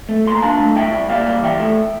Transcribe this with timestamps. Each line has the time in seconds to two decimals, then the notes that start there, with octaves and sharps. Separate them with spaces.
0.09 A3
0.25 A#2 C6
0.35 A#5
0.42 D4 F5 A5
0.59 A3
0.76 E4 E5 G5
0.92 G3
1.09 A#3 D5 F5
1.26 G3
1.43 E3 E5 G5
1.60 A3